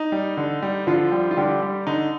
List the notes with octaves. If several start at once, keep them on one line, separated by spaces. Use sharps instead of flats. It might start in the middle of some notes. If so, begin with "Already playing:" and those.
Already playing: D#4
G3
D3
G3
D3 F3 F4
G3
F4
D3 G3 G4
G3
D3 D#4